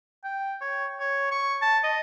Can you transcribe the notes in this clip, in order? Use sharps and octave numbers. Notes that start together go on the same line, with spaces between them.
G5
C#5
C#5
C#6
A5
D#5